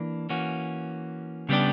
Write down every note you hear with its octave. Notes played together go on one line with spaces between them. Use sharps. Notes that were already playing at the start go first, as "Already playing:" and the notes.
Already playing: E3 A#3 D4
E3 A#3 C#4 F#4
C#3 G3 B3 D4 G4